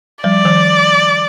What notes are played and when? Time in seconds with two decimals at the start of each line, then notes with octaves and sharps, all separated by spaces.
0.24 F3 G3 D5
0.45 D#3 F3